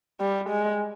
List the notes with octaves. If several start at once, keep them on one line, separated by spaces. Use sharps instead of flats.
G3
G#3